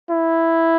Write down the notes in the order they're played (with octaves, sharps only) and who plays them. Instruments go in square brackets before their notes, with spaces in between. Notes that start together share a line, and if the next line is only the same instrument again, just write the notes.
[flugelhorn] E4